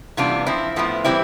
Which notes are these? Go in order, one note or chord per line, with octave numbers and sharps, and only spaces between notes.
C3 E3 G3 B3 D4 F4
F3 C4 E4
A2 F3 B3 E4
E3 G3 C4 E4